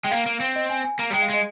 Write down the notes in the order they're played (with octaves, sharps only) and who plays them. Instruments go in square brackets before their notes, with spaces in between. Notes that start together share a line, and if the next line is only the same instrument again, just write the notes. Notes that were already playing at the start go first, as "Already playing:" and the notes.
[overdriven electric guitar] G#3 [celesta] G5
[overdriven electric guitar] A#3 [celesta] F5
[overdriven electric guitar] A#3
C4
[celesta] D#5
G#5
G#5
[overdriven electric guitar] A#3 [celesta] A#5
[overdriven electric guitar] G3
[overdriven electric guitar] G#3 [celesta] G5
[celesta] F5
[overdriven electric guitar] G#3 [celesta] D#5